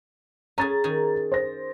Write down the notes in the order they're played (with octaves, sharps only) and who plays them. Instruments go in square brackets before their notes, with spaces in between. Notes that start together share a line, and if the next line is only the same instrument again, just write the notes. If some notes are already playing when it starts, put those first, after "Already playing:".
[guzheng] C#4 G#4 [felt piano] A#5 A6
[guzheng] D#3 C#4 G#4
[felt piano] C5 A#6